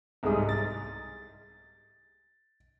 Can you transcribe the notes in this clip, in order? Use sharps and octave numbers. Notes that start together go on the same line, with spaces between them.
C2 G#2 G#3 A3 G#4 D#6
A6